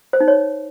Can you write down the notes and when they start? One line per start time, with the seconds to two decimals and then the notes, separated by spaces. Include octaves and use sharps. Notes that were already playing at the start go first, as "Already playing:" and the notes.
0.13 C5
0.20 D#4
0.28 C#5